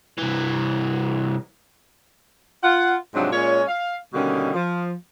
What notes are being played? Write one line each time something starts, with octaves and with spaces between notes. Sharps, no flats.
C2 E3
F4 F#5
G#2 C3 F3 F#3 C4 D4
A#2 G#3 C#4 C#5
F5
B2 D3 D#3 G3 A#3 C#4
F3